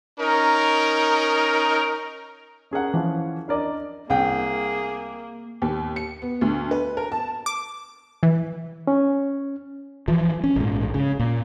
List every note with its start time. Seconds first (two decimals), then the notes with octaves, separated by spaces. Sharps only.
0.20 C#4 D#4 A#4
2.71 C#4 G#4 A#4 F#5
2.94 E3 F3 C#4
3.48 D4 A#4 D5 D#5
4.10 C2 A#3 G#4 G5
5.62 D#2
5.96 C#7
6.22 B3
6.41 D2
6.71 B4
6.97 A#4
7.12 A5
7.46 D6
8.23 E3
8.87 C#4
10.08 E3 F3
10.44 C#4
10.56 A#1 G#2
10.94 C#3
11.20 A#2